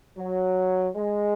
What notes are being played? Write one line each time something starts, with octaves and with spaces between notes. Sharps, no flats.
F#3
G#3